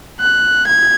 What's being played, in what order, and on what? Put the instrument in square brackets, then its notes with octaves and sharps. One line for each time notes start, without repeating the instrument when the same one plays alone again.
[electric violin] F#6
G#6